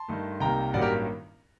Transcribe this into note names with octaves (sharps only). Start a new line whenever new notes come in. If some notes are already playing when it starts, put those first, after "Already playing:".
Already playing: A5 C6
G2 D#3 A3
C2 C3 D#3 G3 A#3 G5 A#5
A1 G2 D#3 F#3 A#3 D5 F#5
G4 A#4